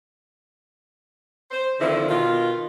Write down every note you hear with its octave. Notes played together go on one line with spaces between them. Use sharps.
C5
D3 D#3 F3 C4 E4
B2 D#3 F4